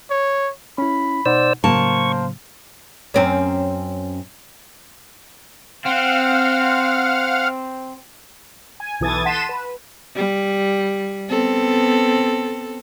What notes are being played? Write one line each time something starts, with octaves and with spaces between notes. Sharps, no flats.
C#5
C#4 E4 B5
B2 D#4 C5 D5 F#5 E6
A2 C#3 F#3 A#3 C5 A5 C#6
F#2 C4 C#4
C4 F5 F#5 F6
G#5
B1 E3 A4 D#6 G#6 A6
F#5 A5 C6 B6 D#7 E7
B4
G3
B3 C4 A4